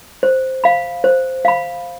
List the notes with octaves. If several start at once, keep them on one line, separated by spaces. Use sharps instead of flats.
C5
F5 B5
C5
F5 B5